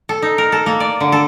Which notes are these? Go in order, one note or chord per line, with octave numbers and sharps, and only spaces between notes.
A4
D#4
A#4
A4
A#3
D5
D3
A4